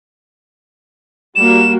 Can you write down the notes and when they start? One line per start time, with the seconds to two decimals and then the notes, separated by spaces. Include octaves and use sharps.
1.36 G3 A#3 F#4 E7